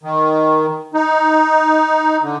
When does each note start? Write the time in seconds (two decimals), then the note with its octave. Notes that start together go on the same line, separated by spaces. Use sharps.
0.03 D#3
0.94 D#4
2.22 D3